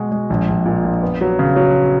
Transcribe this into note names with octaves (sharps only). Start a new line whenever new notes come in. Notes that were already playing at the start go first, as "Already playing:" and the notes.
Already playing: B2 G#3 F#4
G#3
A#1
A#1
A#2
A#1
B3
F#3
C#3
F#3